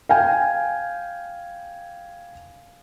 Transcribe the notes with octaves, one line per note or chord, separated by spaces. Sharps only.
F5 G5 G#5